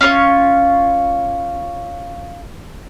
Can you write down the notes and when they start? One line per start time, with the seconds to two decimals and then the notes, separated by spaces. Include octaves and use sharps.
0.01 C#4 F4 A4 C#5